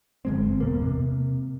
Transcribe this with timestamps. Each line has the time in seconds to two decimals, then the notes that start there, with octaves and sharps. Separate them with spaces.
0.25 G1 G#3 C4
0.60 E2 B2 A#3
0.82 C3